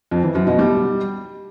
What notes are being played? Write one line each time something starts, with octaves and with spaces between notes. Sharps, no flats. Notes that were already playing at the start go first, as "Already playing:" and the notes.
F2
E3
F#2
B2
G3